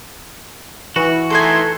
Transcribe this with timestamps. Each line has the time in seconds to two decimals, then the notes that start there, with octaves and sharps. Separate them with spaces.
0.96 E3 F#4
1.30 A3 D#4 A4 B4 G#5 C6